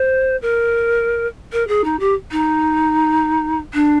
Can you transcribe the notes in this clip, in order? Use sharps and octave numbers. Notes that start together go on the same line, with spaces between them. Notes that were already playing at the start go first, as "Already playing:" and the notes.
Already playing: C5
A#4
A#4
G#4
D#4
G4
D#4
D4